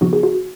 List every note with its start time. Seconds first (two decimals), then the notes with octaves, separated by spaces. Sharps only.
0.01 C#3 F3 B3 D#4 F#4
0.13 G#4
0.23 F#4